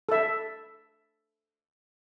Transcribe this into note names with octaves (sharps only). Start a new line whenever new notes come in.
A4 E5